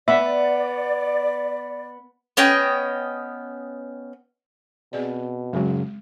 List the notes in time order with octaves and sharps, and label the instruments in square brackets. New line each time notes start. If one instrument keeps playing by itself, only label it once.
[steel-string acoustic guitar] B3 [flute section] D5 [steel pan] E5
[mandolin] B3 C#4 D#5 G5
[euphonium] B2 [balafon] C4 G#4 D5
[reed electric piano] F#2 C#3 F#3 [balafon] G#3